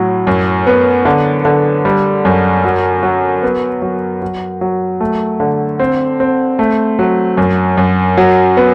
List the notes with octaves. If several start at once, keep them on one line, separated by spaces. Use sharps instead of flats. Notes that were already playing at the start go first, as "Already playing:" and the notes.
Already playing: A2 F#3
F#2
B3
D3
D3
G3
F#2
F#3
F#3
B3
F#3
F#3
F#3
A3
D3
C4
C4
A3
F#3
F#2
F#2
F#3
B3